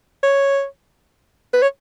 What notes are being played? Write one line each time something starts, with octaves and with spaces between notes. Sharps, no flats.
C#5
B4
C#5